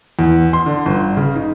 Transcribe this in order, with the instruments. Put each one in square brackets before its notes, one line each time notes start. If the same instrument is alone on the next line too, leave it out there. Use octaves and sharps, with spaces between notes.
[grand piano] E2
C6
D3
G1
C#3
D#4